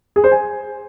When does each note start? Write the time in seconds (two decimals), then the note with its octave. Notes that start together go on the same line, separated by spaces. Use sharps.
0.16 G#4
0.24 C5
0.31 G#5